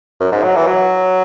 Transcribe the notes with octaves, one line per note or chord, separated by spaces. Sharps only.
F#2
G#2
F#3
E3
F#3